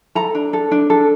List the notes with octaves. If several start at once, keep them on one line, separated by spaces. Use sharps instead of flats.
A4 A#5
D4
A4
D4
A4